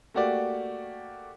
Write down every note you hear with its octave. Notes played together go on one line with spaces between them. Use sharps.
A3 A#3 F#4 G4 D5